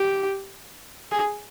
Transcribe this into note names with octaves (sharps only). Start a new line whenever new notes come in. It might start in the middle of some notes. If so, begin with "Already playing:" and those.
Already playing: G4
G#4